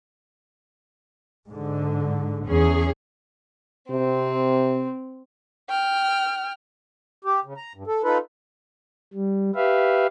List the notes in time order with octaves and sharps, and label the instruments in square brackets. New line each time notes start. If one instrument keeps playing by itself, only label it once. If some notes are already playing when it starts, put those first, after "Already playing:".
[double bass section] G#2 D3
[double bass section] E2 [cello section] C#4 G#4
[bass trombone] C3 [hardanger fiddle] C4
[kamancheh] G5 F6
[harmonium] G4
C#3
A#5
G2
A4
D#4 F4 A4 B4
[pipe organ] G3
G4 B4 E5 F5